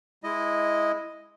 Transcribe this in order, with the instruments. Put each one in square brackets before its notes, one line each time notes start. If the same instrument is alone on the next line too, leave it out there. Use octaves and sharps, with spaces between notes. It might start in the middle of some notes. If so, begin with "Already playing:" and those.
[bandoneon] G#3 E4 D#5